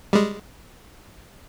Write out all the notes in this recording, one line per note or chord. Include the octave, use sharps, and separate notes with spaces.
G3 G#3